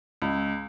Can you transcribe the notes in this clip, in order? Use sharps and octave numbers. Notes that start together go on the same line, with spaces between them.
C#2